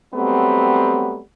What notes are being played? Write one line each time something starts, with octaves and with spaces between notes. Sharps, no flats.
F#3 G3 A3 B3 C4